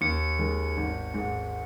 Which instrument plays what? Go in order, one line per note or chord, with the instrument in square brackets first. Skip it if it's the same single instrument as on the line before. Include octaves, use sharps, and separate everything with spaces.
[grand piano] D#2 [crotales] C#7
[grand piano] D#3 G#3
G#1
G#2 G#3